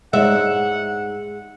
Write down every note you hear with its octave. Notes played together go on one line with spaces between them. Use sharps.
G#2 G#3 E5 F#5